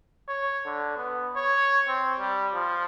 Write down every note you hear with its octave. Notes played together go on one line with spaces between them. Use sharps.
C#5
D3
B3
C#5
C4
G3
F3